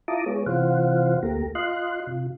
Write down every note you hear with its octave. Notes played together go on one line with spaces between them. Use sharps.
E4 F4 A5 A#5 D6 D#6
G#3 B3 G#4 C#5
C3 E3 F4 C5 F5 F#5
D2 A3 A#3 G4 A#5
F4 D#5 F5 C6 F#6
C3 F4